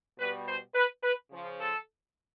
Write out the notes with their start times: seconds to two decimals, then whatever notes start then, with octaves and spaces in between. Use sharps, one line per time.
0.18 B2 G3 B4
0.47 C5
0.74 B4
1.02 B4
1.31 C#3 F3
1.59 A4